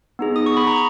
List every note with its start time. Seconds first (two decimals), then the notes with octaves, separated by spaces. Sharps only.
0.19 B3 D#4 G#4
0.36 D#6
0.46 C#6
0.57 B5
0.67 A#5